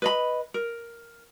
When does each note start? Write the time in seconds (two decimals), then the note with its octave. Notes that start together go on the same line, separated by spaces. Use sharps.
0.02 B4 D#5 B5
0.54 A#4